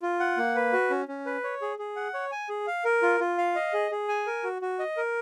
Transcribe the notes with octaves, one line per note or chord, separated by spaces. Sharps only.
F4
F#5
A#3
B4
F#4
C#4
C#4
B4
C#5
G#4
G#4
F#5
C#5
G#5
G#4
F5
A#4
F4
F4
F5
D#5
G#4
G#4
G#5
A#4
F#4
F#4
D#5
A#4